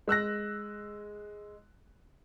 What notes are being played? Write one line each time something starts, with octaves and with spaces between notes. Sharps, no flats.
G#3 E6 F#6 A#6